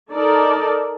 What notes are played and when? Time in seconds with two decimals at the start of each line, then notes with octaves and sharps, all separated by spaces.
0.12 D#4 A4 A#4 D5